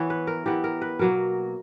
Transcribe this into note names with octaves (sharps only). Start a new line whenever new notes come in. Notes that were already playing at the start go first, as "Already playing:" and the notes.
Already playing: E3 B3 E4 C#5
B4
A#4
E3 B3 E4 G4
A#4
B4
B2 F#3 A#3 A#4